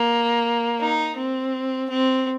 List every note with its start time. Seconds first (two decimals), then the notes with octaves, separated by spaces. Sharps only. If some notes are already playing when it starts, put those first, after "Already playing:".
Already playing: A#3
0.80 D#4
1.17 C4
1.90 C4